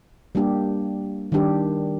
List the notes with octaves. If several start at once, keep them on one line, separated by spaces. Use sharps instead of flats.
G3 A#3 D4 G4
D#3 G3 D4 G4